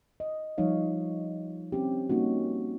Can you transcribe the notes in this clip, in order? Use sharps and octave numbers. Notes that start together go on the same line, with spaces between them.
D#5
F3 G3 D#4 C#5 F5
C4 C#4 G4
G3 A#3 C#4 D#4 F#4